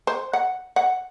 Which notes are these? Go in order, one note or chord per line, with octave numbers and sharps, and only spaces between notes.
C5
F#5
F#5